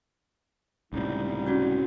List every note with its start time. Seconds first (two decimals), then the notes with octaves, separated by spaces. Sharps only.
0.93 C#2 A2 C3 G3 D#4
1.46 C#4 F#4 G6